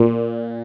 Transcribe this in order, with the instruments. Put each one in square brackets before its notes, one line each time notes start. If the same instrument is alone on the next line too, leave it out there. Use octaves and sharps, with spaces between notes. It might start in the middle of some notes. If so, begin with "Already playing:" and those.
Already playing: [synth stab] A#2